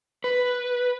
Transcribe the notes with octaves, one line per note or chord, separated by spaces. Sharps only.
B4